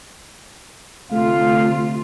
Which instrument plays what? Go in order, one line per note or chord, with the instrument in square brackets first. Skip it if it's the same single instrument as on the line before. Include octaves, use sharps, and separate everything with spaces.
[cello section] D2 C3 F4 [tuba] A3 [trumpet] F5